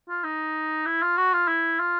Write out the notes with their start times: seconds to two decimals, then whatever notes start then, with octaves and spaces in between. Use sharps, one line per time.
0.09 F4
0.24 D#4
0.86 E4
1.02 F4
1.17 F#4
1.33 F4
1.48 E4
1.80 F4